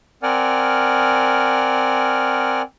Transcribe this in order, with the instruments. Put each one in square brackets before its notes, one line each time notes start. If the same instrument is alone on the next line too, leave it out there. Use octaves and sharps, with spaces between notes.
[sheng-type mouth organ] C4 A#4 D5 F#5 G#5 F6